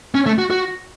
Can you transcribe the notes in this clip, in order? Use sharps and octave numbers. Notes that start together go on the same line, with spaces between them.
C#4
A3
F#4
F#4